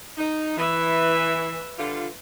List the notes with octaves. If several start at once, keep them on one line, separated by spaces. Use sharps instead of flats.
D#4
E3 B4 E5
D3 G3 F4